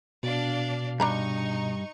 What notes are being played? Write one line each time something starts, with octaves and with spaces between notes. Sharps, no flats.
B2 D4 D5 F5
G2 D4 D#4 A#5 B5 C#6